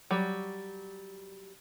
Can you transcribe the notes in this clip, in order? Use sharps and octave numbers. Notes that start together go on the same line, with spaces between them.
F#3 G3